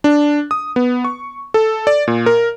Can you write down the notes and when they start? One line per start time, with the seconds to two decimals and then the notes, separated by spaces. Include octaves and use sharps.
0.04 D4
0.51 D#6
0.76 B3
1.05 C#6
1.54 A4
1.87 D5
2.08 A#2
2.26 A#4